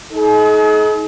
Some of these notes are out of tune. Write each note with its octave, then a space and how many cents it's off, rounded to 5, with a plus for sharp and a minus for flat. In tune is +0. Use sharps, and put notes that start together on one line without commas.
D#4 +25 G#4 +45